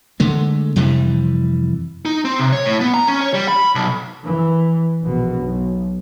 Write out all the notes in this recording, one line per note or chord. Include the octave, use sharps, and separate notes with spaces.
D3 G#3 A3
F2 C3 E3 G3
D#4
C4
C3
C#5
A2
B3
A#5
C#4
C#5
G3
B5
B1
E3
A#1 B2
B1